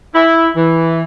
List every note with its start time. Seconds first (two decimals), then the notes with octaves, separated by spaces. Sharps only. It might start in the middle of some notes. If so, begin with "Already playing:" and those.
0.14 E4
0.57 E3